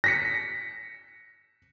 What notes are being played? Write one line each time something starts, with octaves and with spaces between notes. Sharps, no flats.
A#6 B6 C#7